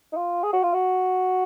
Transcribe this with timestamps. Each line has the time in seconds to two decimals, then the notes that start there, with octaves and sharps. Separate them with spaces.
0.12 D#4
0.17 F4
0.43 G#4
0.53 F#4
0.63 F4
0.74 F#4